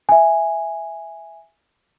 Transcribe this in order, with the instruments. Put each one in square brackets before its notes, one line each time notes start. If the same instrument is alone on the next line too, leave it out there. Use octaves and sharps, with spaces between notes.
[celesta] E5 G#5